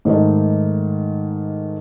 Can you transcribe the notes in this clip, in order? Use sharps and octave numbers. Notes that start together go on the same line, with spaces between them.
G#2 D#3 A3 D#4